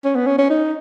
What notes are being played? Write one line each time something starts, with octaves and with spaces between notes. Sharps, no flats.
C#4
B3
C#4
C#4
D#4